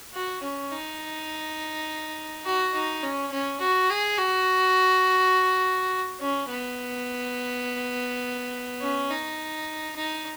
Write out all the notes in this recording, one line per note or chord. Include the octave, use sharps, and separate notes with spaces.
F#4
C#4
D#4
F#4
D#4
C#4
C#4
F#4
G#4
F#4
C#4
B3
C#4
D#4
D#4